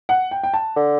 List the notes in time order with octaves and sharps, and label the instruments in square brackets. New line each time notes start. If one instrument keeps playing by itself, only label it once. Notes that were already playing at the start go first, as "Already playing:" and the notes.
[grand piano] F#5
G5
G5
A5
[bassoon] D3